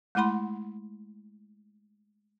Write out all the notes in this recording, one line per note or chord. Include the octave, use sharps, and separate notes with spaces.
G#3 A3 E4 F#5 B5 C6